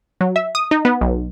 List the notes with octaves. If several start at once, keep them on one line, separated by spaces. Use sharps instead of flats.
F#3
E5
D#6
D#4
B3
B1